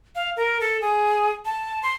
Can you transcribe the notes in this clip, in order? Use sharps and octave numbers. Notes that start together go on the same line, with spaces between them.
F5
A#4
A4
G#4
A5
C6